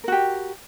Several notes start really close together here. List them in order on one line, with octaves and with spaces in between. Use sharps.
A#4 F#4 G4